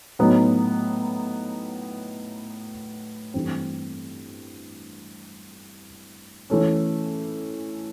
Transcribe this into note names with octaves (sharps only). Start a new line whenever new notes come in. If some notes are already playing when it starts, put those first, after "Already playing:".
A2 F#3 B3 D#4
G2 E3 A3 C4
E3 A3 C#4